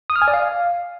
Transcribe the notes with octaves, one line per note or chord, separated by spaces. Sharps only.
D#6
F6
G#5
D5
F5